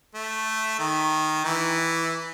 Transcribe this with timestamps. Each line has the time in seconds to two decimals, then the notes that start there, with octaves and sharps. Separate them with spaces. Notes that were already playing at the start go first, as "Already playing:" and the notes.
0.14 A3
0.79 D#3
1.44 E3